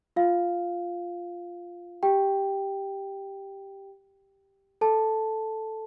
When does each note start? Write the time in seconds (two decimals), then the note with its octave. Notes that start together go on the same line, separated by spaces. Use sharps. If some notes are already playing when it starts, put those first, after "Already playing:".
0.16 F4 F5
2.03 G4 G5
4.81 A4 A5